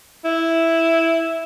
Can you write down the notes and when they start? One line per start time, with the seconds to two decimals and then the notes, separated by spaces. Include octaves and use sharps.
0.24 E4